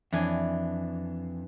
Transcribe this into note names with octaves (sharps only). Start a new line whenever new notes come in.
F2 E3 D4 G#5